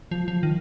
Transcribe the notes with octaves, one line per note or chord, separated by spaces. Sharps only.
F3
F3
D#3